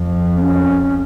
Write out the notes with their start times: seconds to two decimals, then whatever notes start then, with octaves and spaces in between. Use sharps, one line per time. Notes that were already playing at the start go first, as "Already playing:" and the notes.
Already playing: F2
0.36 C4
0.42 C#4